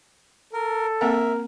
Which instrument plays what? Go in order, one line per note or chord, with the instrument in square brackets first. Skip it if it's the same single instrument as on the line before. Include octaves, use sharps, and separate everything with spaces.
[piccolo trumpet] A4 [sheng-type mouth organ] A#4
[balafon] A#3 C4 F#5 [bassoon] A#4 [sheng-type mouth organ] E5